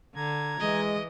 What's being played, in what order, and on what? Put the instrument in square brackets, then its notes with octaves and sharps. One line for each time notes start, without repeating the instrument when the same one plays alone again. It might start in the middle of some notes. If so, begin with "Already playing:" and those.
[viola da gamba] D3 [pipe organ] A#5 G#6
[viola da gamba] E3 [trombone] G#3 [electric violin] D#5